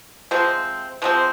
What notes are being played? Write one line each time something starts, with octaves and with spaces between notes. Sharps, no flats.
C3 F3 G#3 C4
C3 F3 G#3 C4